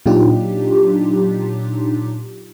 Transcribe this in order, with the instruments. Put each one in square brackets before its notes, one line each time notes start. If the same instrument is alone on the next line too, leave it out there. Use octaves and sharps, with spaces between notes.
[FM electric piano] A#2 F#3 D4 D#4 F4 G4